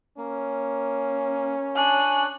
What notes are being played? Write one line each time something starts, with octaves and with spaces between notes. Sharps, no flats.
A#3 C#4
D4 C#5 D5 G#5 F#6